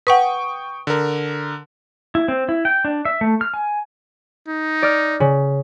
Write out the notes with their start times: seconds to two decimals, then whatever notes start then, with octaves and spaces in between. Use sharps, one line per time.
0.07 B4 F#5 G5 C#6 D#6
0.87 D3 A#4
2.15 E4
2.28 C4
2.49 E4
2.65 G5
2.85 D4
3.05 E5
3.21 A3
3.41 F6
3.54 G#5
4.48 D#4
4.83 D5 F6
5.20 C#3